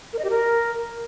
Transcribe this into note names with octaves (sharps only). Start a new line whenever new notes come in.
A#4
D#5
G4
A#4